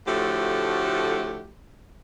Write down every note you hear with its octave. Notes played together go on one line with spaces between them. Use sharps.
A2 D3 F3 A3 F#4 G4